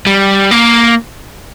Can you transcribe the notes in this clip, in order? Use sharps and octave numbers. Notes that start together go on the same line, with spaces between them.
G3
A#3